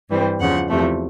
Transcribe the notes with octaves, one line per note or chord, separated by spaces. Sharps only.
G2 E3 G3 C4
E2 C#3 F3 F#5
E2 C3 F3 A3